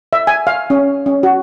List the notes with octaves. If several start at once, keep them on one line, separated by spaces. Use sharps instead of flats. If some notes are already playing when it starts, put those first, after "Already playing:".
E5
G#5
F5
C#4
C#4
F#4